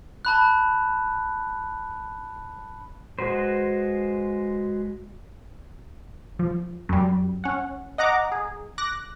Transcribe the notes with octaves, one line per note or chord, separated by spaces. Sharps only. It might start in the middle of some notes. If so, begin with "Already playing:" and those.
A5 B5 F#6
G#3 F#4 B4 C5
F3
F#2 G3
C#4 F#5
D#5 F#5 A#5 D6
G#4
D6 F#6 A#6